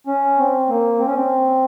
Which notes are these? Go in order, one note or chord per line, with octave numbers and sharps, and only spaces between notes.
C#4
C4
A#3
C4
C#4
C4